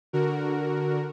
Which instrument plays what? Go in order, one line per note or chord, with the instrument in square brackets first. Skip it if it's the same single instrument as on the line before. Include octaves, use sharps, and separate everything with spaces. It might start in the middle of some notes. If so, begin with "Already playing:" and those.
[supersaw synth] D3 F#4 A#4